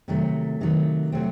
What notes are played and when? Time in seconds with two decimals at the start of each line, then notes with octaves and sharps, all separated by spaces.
0.08 C3 D#3 F#3 A3
0.60 C3 D#3 F#3 A3
1.12 C3 F#3 A3 C4